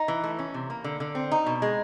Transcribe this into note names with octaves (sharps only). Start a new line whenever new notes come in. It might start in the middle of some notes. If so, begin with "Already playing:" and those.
Already playing: D#4
E3
A3
C#4
C3
A#3
D3
D3
C4
D#4
B2
G#3